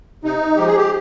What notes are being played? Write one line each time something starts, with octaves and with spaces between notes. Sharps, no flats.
C3 D#4
F3 G#3 G4
G#4
G4